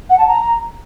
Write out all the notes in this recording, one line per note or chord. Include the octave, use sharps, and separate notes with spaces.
F#5
A5
A#5